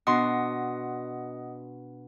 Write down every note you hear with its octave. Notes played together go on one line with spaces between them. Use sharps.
B2 D4 D#5 F#5 C6 D#6